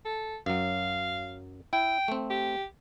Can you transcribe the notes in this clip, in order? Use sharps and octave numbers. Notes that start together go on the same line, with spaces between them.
A4
F#2 F#3 F5
E4 G5
A3 C4
G4